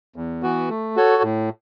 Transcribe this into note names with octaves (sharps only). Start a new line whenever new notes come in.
E2
E3 B3 F#4
A3
F#4 A4 C#5
A2